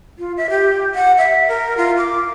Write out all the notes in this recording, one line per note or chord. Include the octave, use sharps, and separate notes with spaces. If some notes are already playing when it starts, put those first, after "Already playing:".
F4
E5
G4
F#5
E5
A#4
F4
D6